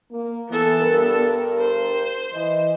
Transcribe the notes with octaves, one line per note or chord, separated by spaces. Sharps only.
A#3
E3 B3 A4
G2 A#4
C5
E3 D#5